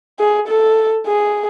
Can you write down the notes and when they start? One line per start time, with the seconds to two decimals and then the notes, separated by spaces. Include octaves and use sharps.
0.19 G#4
0.48 A4
1.07 G#4